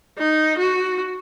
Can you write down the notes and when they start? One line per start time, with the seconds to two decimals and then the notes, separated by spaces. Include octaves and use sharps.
0.18 D#4
0.58 F#4